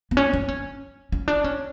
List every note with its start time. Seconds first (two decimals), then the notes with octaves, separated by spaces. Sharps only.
0.11 B3
0.17 C#4
0.33 D4
0.48 C#4
1.12 C#4
1.28 D4
1.44 C#4